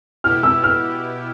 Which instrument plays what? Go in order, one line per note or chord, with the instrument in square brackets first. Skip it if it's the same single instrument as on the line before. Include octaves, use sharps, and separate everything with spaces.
[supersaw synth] B2 B3 E4 G4 [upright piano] F6
[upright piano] E6
F6